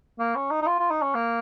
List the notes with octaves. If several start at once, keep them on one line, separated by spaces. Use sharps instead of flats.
A#3
C#4
D#4
D#4
F4
F4
D#4
C#4
A#3